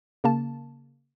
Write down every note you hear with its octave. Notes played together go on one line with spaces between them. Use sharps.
C#3 A#3 A5